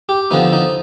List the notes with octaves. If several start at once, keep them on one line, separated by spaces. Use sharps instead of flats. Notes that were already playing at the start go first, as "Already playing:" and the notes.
G4
D3 F3 B3 D#4
D#4